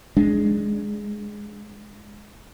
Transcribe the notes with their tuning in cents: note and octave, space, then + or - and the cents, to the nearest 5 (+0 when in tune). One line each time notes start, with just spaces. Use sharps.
G#3 +0 D4 +0